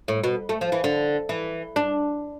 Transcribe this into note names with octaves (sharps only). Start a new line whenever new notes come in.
A2
B2
A3
F3
E3
D3
E3
D4